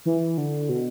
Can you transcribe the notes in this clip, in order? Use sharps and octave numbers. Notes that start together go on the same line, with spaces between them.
E3
D3
B2